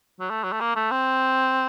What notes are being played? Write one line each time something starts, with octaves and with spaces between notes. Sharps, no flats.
F#3
A3
F#3
A3
A#3
A3
C4